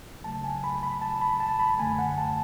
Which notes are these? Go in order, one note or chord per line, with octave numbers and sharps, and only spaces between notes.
C#2 C#3 F#3 A3 A5
G#5
B5
B5
A5
B5
A5
B5
F#2 D3 A3 G#5
F#5
A5